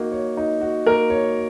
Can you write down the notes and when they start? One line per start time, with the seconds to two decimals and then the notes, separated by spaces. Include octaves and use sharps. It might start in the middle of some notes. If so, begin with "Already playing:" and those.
Already playing: A#3 D#4 F#4
0.12 C#5
0.37 D#4
0.61 F#4
0.86 A#3 A#4
1.10 C#5